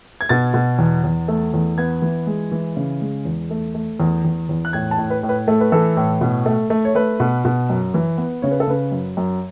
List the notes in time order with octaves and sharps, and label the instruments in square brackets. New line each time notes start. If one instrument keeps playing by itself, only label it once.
[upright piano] G#6
B2 A6
B2
E2
E2
A3
E2
B3 G#6
E3
G#3
E3
C#3
G#3
E2
A3
A3
E2
E2
E2
F#6
A2 G#6
A5
A2
B4
A2
B4
A3 A4
B4
E3 A4
A2
B2
A3
A3
C#5
A3 B4
B2
B2
F#2
E3
B3
C#3 C#5
B4
A4
C#3 B4
F#2
F#2